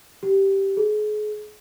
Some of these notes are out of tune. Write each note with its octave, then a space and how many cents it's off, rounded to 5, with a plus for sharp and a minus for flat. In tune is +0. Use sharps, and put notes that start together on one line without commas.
G4 -5
G#4 +35